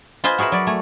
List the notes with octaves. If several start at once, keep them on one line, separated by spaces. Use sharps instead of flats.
F4 B4 C5 D#5 G#5
F#4 G#4 A#4 B4 E5
F#3 D5
A3 G#5